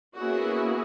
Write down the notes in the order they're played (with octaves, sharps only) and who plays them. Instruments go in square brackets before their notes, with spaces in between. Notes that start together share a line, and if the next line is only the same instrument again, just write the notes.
[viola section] A#3 B3 C#4 E4 F#4 G#4